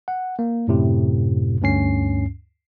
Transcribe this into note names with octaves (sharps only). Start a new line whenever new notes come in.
F#5
A#3
F#2 A2 C3
D2 G2 C#4 C7